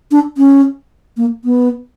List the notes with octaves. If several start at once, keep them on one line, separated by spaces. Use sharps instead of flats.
D4
C#4
A#3
B3